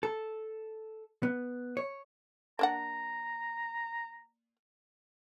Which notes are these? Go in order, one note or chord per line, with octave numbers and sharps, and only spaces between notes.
A4
B3
C#5
A#3 D4 F#5 A#5